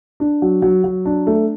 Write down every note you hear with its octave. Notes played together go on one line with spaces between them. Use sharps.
D4
F#3
F#3
F#3
D4
A3